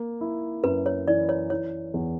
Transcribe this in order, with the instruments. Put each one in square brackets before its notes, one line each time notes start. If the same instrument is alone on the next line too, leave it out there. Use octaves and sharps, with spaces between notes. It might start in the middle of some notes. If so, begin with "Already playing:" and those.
Already playing: [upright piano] A#3
E4
[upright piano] F#2 [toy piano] B4
[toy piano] C#5
[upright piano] E3 [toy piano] D5
[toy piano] C#5
[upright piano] E3 [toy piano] C#5
[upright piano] E2